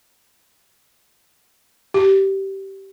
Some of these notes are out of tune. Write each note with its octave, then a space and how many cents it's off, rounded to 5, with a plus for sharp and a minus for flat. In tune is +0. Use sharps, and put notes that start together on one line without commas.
G4 -20